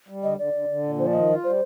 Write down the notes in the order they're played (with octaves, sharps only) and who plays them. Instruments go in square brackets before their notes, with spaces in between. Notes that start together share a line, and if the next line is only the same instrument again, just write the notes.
[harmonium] G3
[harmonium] D3 [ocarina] D#5
[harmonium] D3 [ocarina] D5
[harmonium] D3
D3
A#2
[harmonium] F3 [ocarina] C5
[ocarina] D5
[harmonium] D#3 [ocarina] D#5
[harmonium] F4
[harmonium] G3 [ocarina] C5